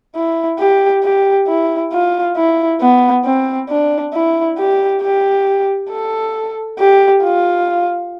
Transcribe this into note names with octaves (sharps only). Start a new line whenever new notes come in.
E4
G4
G4
E4
F4
E4
B3
C4
D4
E4
G4
G4
A4
G4
F4